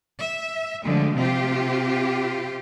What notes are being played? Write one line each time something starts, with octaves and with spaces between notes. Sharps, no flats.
E5
D3 F3 F#3 G#3 A3
C3 C4 F4 G4